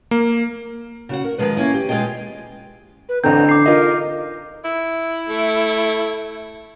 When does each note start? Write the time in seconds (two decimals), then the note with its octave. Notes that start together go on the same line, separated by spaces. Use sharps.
0.11 A#3
1.09 C#3 F#4 F#5
1.24 A#4
1.38 D#3 F3 G#3 B4
1.57 A#3 C#4 E4
1.74 G4
1.89 B2 G#3 F4 G#4 D#5 G5
3.09 B4
3.24 A1 D3 C4 A#5 G6
3.49 D6 C7
3.66 D#4 F4 A#4
4.65 E4
5.29 A3